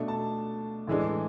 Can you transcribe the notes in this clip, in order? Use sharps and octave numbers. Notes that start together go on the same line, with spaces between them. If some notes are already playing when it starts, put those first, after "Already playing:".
Already playing: B2 A3 D4
A5
A2 E3 G#3 D4